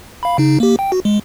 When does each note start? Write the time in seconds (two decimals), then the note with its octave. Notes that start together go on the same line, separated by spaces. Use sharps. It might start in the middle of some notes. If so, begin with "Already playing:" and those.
0.23 F5 B5
0.38 C#3 D#4
0.60 A#3 G4
0.79 G5
0.92 F#4
1.05 G#3